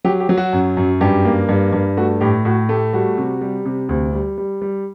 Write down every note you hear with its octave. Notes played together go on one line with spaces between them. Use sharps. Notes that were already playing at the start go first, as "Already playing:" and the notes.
F#3 G4
G4
F#3
F#4
F#2
F#2
G2 G4
A#3
G2
G2
A3 F#4
A2 G4
A2 F#4
A3 G4
G3 F#4
C3
G3
C3
D2
G3
G3
G3